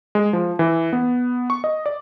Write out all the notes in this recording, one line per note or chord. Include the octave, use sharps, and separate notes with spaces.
G#3
F3
E3
B3
C#6
D#5
D5